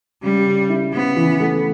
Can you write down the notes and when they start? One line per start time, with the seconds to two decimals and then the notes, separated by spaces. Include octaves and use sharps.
0.23 C#3 G3
0.46 C#3
0.69 E4
0.93 C#3 B3
1.16 E3
1.40 A3